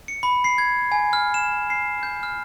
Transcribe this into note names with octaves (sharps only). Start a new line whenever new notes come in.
C#7
B5
C7
G#6
G#5
F6
E7
C7
G6
F6